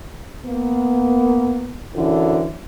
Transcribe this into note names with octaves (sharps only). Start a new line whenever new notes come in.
A#3 B3
F#2 D3 E3 E4